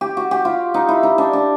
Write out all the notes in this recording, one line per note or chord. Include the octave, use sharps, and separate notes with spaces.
G4
F#4
G4
F4
D#4
E4
D#4
D4
D4